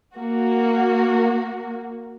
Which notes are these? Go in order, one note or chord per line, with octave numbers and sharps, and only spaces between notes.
A#3 F#4